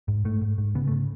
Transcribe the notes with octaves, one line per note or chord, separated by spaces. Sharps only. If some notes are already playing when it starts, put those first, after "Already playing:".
G#2
G#2 A3
G#2
G#2
C#3 B3
A3
C#3